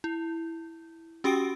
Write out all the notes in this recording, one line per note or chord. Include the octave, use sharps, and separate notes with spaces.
E4
C#4 F#4 G4 G5 D#6 D7